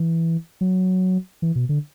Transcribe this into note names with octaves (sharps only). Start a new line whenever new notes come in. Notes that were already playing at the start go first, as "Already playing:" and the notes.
Already playing: E3
F#3
E3
B2
D3